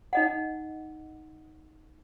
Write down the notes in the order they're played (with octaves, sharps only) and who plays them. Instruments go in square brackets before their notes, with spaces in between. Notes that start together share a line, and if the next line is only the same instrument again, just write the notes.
[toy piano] D#4 D#5 F#5